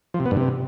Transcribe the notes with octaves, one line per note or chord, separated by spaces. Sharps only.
F3
C3
B3
G2
C3